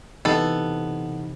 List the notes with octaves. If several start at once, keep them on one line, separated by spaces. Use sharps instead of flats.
C3 E3 B3 D#4 A4